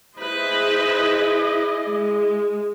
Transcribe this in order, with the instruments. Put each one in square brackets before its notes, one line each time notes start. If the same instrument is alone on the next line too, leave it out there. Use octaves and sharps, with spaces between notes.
[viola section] E4 G#4 D#5 [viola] B4 C5
[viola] G#3